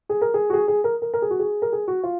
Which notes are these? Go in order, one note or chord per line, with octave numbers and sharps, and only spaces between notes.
G#4
A#4
G#4
F#4
G#4
G#4
A#4
A#4
A#4
G#4
F#4
G#4
A#4
G#4
F#4
F4